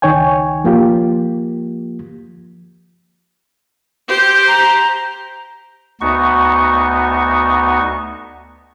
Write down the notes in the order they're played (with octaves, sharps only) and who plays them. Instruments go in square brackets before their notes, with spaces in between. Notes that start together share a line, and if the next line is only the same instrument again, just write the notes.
[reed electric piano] C#2 D#3 D#4 C#5 G5 G#5
F3 A#3 F4 G4
[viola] G4 C5
[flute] A#5
[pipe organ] D2 B3 D#4 F#4 C#6